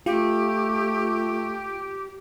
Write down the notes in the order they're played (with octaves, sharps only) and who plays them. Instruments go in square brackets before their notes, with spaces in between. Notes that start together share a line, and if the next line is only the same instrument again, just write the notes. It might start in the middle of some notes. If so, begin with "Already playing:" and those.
[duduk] A3 [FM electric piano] F4 [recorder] G4